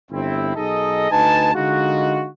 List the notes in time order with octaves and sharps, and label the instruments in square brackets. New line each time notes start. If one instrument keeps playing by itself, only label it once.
[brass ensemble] G1 C4 E4
B1 D#4 G#4 A4 D#5
D2 D#4 B4 G#5 A5
D3 G#3 D#4 F4 F#4